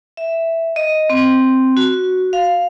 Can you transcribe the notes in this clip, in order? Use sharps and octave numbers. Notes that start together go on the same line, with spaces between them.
E5
D#5
C4
F#4
F5